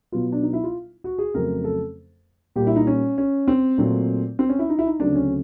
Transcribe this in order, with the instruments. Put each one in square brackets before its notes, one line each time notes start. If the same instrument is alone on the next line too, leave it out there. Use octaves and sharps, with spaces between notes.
[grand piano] B2 F#3 B3 F4
D4
D#4
E4
F4
F#4
G#4
F2 C#3 F#3 A3 C4 A#4
A4
A#2 G3 A#3 G4
E4
D#4
C#4
C#4
C4
A#2 F#3 A3 C4
C4
C#4
E4
D#4
E4
D#4
D2 C#3 F#3 A3 C4 D4
C#4